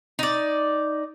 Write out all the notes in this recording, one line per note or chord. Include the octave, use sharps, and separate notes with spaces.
D#4 D5